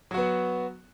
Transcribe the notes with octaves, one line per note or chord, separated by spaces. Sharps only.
F#3 B3 F#4